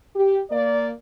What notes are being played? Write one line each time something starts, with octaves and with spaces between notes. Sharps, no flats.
G4
A#3 D5